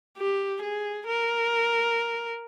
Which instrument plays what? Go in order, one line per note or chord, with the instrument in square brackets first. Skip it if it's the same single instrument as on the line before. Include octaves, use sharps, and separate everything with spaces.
[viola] G4
G#4
A#4